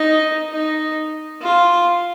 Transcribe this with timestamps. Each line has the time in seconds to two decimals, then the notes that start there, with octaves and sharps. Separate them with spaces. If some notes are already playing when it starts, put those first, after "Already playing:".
Already playing: D#4
0.51 D#4
1.41 F4